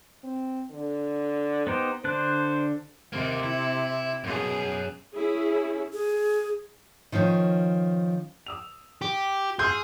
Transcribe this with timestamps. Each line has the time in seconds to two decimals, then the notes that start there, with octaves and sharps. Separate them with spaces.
0.24 C4
0.71 D3
1.67 B3 D#4 G4 C5
2.04 D3 D4 C5 F#6
3.13 D#2 C3 A#3
3.43 E4
4.24 F#2 B2 G#4
5.12 C#4 E4 G#4
5.93 G#4
7.12 D#3 F3 C#4 D#4
8.46 D#6 E6 F7
9.02 G4
9.59 G#4 C6 E6 F6 G6